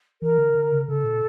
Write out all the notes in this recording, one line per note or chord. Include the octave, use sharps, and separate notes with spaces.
E3 A#4
D3
D3
C#3
C#3 A4
A#2